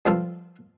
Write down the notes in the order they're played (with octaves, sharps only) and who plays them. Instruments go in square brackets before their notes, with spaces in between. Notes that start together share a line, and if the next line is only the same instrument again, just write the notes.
[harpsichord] G2 F3 C4 F4 A4